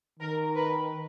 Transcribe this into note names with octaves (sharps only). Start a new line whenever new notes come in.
D#3 A#4
B4